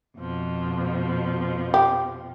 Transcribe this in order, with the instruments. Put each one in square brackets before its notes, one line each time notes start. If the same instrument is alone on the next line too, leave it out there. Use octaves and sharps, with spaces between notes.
[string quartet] F2 B2 F3
[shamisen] G4